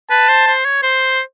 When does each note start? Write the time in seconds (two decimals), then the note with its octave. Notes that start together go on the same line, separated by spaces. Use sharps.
0.10 B4 A5
0.29 C5
0.47 C5
0.65 C#5
0.83 C5